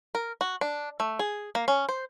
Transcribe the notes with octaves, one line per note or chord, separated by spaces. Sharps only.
A#4
F#4
D4
A3
G#4
A#3
C#4
C5